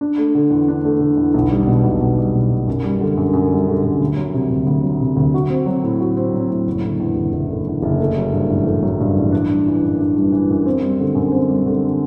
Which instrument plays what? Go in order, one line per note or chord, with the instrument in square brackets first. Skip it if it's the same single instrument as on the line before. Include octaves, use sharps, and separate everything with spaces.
[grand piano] D4
A3
D3
E2
D4
A3
D3
E2
B1
G3
B2
B1
B1
G3
B2
B1
F#2
G3
D3
F#2
F#2
G3
D3
F#2
D2
F#3
C3
D2
D2
F#3
C3
D2
F#4
C4
F#3
A2
F#4
C4
F#3
A2
F#1
D3
E2
F#1
F#1
D3
E2
F#1
A3
F#3
G2
A1
A3
F#3
G2
A1
D4
G3
E3
F#2
D4
G3
E3
F#2
C4
G3
D3
F#2
C4
G3
D3